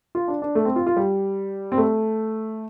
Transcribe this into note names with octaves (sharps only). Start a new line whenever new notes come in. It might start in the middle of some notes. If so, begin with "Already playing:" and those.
F4
D4
D4
A3
C4
F4
F4
G3
C4
A3